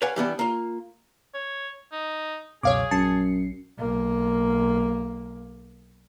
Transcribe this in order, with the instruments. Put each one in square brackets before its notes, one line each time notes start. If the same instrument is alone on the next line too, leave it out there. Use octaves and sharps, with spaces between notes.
[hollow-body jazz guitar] B4 C#5 D5 F5 F#5 G#5
E3 G3 B3 D4
A#3 F4
[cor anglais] C#5
D#4
[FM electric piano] C#2 F#2 B2 [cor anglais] G#4 [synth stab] C#5 F5 D6
[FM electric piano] A#1 C7 C#7 [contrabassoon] F#2 [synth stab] A5
[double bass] B1 A#3